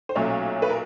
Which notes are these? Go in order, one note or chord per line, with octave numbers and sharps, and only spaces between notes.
C5
B1 A#2 F#3 A3 C#4 C#5
B4
A#4